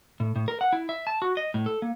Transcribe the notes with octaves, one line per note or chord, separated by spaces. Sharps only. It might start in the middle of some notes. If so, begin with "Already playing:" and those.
A2
A2
A#4
F#5
E4
E5
A5
F#4
D#5
A2
A4
A#3